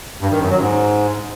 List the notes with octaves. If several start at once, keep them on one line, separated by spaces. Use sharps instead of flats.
G2
D#3
F#2
F#3
G#2